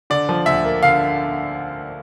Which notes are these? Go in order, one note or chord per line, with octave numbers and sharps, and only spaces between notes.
D3 D5
F3
D2 E5
A#3
D3 F5